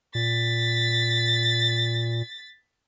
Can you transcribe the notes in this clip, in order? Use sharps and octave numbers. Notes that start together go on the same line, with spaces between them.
A#2 A6 B6